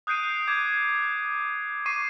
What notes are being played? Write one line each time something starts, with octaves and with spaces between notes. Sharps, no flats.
D#6 F#6 G6 C7 D7 D#7
D6 G#6
C#6 D6 C7 D#7